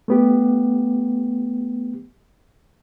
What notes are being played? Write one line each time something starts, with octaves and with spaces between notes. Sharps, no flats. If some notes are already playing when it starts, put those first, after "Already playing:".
A3 B3 G4